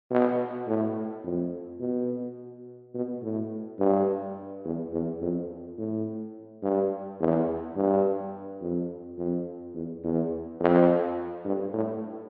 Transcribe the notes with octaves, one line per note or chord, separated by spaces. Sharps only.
B2
A2
F2
B2
B2
A2
G2
E2
E2
F2
A2
G2
E2
G2
F2
F2
E2
E2
F2
G2
A2